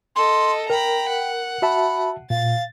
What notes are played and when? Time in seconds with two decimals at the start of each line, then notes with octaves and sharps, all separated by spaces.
0.16 A4 D#5 C6
0.70 A#4 G5 A#5 B5
1.10 F#5
1.62 F#4 E5 A5 B5
2.30 A#2 F5 A6